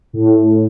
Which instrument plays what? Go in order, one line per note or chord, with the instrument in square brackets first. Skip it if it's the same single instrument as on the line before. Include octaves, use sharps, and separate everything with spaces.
[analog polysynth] A2